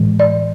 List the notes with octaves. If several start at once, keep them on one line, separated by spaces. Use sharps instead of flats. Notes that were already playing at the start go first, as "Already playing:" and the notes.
Already playing: A2 E3 G#3
D5